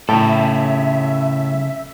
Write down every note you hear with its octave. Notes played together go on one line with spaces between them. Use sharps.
A2 C#3 A4 E5 G5 A#5